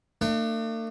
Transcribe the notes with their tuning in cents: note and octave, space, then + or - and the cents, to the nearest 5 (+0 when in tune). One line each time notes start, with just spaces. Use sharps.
A3 +45 D4 +40